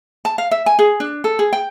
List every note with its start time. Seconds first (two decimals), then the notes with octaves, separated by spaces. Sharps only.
0.25 A5
0.38 F5
0.51 E5
0.66 G#5
0.79 G#4
1.00 D4
1.24 A4
1.39 G#4
1.53 G5